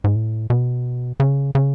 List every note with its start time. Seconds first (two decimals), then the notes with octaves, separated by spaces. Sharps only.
0.04 G#2
0.15 A2
0.50 B2
1.20 C#3
1.55 C#3